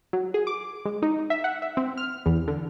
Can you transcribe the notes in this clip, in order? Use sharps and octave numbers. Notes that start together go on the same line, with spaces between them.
F#3
G#4
D6
G#3
D#4
E5
F#5
E5
C4
F6
E2
D3